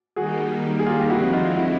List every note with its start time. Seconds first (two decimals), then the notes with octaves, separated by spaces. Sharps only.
0.16 D#3 G3 A#3 D#4 F#4 G#4
0.79 G#4
0.86 F4 G4
0.99 G4
1.10 D3 F3 G#3 C4 E4 F#4
1.33 D#4 F4
1.56 E4 F#4